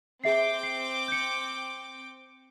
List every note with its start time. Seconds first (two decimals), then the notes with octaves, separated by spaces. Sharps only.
0.24 C4 G#4 E5 G5 D6 C7
0.63 C7
1.08 G6 C#7